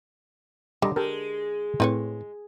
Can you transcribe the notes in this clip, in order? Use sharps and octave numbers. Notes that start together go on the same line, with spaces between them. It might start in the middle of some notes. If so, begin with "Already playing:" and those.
D3 G3 D#5 A#5
G#3 G4 A4 A#4
A2 C4 B4 C#5